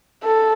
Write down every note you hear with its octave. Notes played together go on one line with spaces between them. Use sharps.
A4